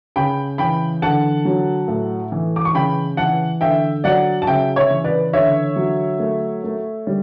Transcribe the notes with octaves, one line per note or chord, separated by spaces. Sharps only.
C#3 G5 B5
E3 G5 B5
D3 F#5 A5
F#3
A2
E3
D6
C#6
C#3 G5 B5
E3 F#5 A5
D3 E5 G5
F#3 D5 F#5
A5
C#3 E5 G5
C#5 E5
E3
B4 D5
D3 C#5 E5
F#3
A3
A3
G3